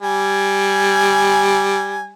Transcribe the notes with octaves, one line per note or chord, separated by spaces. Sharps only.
G3 G#5